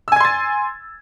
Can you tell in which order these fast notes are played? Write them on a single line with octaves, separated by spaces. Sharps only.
E6 G#5 G#6 C6 A6